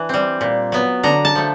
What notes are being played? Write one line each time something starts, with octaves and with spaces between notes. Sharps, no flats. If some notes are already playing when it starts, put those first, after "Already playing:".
Already playing: E3 D4
G3 C4
A#2
F#3 B3
D3 A#5
A5
F3 A3